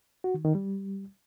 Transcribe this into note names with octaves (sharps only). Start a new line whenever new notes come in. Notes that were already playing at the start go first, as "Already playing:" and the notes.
F#4
D#3
D#3
G3